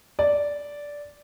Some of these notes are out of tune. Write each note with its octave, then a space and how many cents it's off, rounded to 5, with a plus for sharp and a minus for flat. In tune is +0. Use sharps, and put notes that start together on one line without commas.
D5 -10